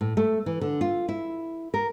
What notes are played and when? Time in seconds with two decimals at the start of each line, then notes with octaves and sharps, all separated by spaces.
0.01 A2
0.17 A3
0.46 E3
0.61 D3
0.81 F4
1.09 E4
1.74 A#4